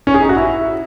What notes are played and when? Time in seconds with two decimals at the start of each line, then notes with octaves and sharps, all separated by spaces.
0.07 C#4
0.14 G#4
0.22 D#4
0.29 F#4
0.36 E4